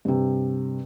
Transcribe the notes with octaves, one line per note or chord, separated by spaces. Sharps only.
G2 C3